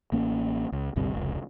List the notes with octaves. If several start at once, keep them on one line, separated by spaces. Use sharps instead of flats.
A1 A#3 C#4
C#2
G#1 D2 G2 C3
F1 C#2